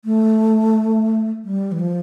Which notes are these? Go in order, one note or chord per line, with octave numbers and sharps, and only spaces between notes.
A3
G3
E3
F3